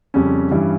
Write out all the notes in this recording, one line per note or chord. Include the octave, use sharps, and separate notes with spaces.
F2 C#3 G3 C#4
G2 E3 G3 C#4